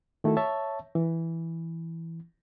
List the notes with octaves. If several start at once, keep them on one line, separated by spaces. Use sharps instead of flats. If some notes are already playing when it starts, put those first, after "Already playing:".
D#3 A3 E4 F#4 A4
C#5 E5 A5
E3